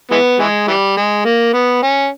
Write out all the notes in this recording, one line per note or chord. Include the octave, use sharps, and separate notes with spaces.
E3 G#3 B3
E3 G#3
E3 G3
G#3
A#3
B3
C#4